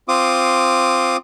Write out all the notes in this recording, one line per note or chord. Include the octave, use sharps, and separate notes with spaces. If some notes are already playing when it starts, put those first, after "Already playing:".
C4 F4 D6 D#6